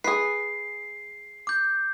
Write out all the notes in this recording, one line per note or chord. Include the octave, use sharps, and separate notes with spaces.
G#4 B4 C7
D6 G6